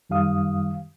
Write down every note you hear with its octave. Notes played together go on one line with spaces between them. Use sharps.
F#2 D#3 G3 F5 D#6